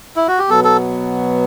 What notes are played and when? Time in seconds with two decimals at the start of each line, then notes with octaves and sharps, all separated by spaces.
0.16 E4
0.28 F#4
0.39 G4
0.50 B2 F#3 B3 A4
0.64 A4